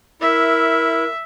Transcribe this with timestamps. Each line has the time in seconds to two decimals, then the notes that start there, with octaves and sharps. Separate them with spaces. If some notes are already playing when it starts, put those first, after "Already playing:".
0.22 E4 A#4 E5